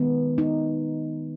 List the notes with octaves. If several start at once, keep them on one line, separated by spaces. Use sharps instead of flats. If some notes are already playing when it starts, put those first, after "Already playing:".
Already playing: D#3 G#3 B3
D#4